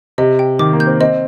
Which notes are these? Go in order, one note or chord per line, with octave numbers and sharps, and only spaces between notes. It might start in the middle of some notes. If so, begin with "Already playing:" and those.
C3 D#5
G5
D#3 D6
A#3
G6
C4
C4 D#5